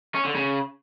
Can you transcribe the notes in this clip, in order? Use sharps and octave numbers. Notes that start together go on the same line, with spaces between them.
C#4
D3
C#3